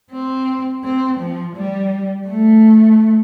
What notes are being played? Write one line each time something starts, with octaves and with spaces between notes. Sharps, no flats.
C4
C4
F3
G3
A3